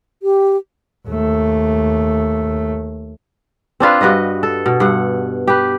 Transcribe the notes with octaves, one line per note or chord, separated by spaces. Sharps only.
G4
D#2 A3
C4 D4 F4 B4
G2 F#4 B4 D#5
A4
B2
G2 F#5
G4 B4